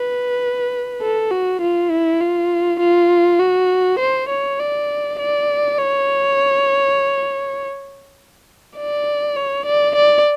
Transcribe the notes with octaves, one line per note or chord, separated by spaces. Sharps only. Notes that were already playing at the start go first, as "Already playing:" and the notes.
Already playing: B4
A4
F#4
F4
E4
F4
F4
F#4
C5
C#5
D5
D5
C#5
D5
C#5
D5
D5